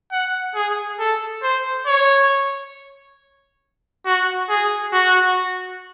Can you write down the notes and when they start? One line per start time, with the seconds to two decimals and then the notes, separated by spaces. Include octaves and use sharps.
0.12 F#5
0.55 G#4
1.00 A4
1.43 C5
1.87 C#5
4.06 F#4
4.49 G#4
4.93 F#4